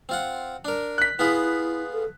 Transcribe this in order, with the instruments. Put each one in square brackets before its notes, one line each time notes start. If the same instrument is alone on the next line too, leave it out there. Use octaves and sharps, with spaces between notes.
[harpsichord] C4 F4 F#5
D4 A#4
[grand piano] F#6 B6
[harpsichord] B3 F4 G#4 [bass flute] E4
[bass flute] A4